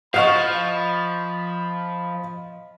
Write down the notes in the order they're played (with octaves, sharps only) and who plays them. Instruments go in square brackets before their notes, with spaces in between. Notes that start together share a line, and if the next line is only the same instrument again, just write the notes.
[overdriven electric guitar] F3 [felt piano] D#5 F5 [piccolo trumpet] B5 [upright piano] C#6 F6 C7